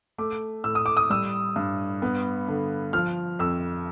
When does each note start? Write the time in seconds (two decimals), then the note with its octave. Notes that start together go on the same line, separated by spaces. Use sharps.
0.18 A3 D6
0.64 A2 E6
0.75 D#6
0.86 D6
0.97 D#6
1.10 G3 E6
1.56 G2
2.02 B3
2.48 D3
2.93 F3 F6
3.39 F2 E6